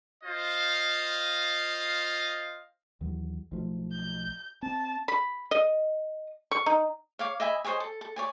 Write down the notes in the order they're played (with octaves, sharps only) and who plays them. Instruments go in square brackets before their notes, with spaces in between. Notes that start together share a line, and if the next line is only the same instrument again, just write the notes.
[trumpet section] F4 C5 D#5 F5
[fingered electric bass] D#2 E3 F#3
B1 F3 A3
[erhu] G6
[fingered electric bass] C4 [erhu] A5
[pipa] B5
D#5
C#6
D#4
[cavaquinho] C#5 F5 D6
D#5 E5 G#5 B5
C5 C#5 D#5 G#5
A4
A4
C#5 D5 G#5